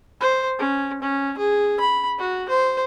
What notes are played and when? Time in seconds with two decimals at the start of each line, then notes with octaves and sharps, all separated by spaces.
0.21 C5
0.59 C#4
1.02 C#4
1.38 G#4
1.80 B5
2.18 F#4
2.49 C5